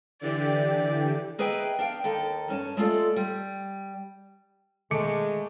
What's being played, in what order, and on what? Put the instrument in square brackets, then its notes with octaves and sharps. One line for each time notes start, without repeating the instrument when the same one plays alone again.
[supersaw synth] D3 E3 G4 [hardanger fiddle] D5
[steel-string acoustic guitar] A#3 G#4 B4 D#5 E5 G5
D4 F5 G5
D#2 D#3 A4
G2 C#4 A5
G#3 A3 F4 A4 D5
G3
[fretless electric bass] B2 D#3 [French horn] G#3 [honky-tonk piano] A3 [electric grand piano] D6 C#7